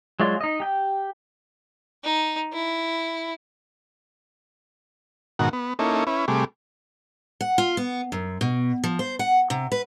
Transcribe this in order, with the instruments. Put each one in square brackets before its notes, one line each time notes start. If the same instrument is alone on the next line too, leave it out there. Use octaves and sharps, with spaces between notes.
[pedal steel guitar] F#3 G#3 F4 D5
D#4 D#5
G4 G5
[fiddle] D#4
E4
[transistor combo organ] G#2 B2 D#3 F#4 A#4 F#5
B3
A#3 C#4 D#4 E4 A4
C#4 E4 B4
C3 G3 A3 G#4 D6
[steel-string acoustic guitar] F#5
F4
B3
F#2
B2
F3
C5
F#5
C3
B4